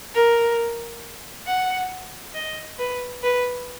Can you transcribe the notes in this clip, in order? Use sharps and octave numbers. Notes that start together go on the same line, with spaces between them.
A#4
F#5
D#5
B4
B4